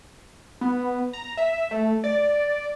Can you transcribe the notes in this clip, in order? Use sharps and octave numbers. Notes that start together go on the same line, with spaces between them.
B3
A#5
E5
A3
D5